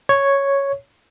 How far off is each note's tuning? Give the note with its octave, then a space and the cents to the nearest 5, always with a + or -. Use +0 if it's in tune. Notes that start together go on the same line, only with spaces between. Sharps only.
C#5 +0